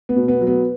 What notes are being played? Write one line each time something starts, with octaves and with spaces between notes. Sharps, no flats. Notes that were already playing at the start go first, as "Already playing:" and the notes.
B3
B2
B3
F#3
B3